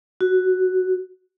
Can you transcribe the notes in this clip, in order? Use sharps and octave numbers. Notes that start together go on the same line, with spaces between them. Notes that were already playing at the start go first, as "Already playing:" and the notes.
F#4